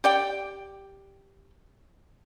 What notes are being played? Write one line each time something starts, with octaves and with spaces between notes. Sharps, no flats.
G4 D5 G5